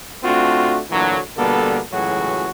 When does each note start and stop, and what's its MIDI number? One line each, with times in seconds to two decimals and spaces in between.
0.24 0.79 57
0.24 0.79 60
0.24 0.79 62
0.24 0.79 65
0.24 0.79 66
0.90 1.19 38
0.90 1.19 46
0.90 1.19 50
0.90 1.19 52
0.90 1.19 54
1.37 1.79 47
1.37 1.79 50
1.37 1.79 55
1.37 1.79 58
1.37 1.79 59
1.37 1.79 69
1.92 2.50 37
1.92 2.50 45
1.92 2.50 52
1.92 2.50 54
1.92 2.50 66
1.92 2.50 68